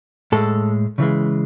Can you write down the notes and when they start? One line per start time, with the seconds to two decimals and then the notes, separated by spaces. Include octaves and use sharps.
0.32 A2 G#3 A4
0.98 C#3 E3 G#3